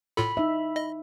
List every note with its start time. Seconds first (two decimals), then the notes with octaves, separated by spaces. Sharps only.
0.17 A2 F4 A4 B5
0.37 D#4 E5
0.76 D#5